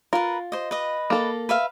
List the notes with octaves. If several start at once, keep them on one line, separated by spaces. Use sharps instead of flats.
F4 A#4 B4
C5 D#5
B4 D#5
A#3 A4
B4 E5 F5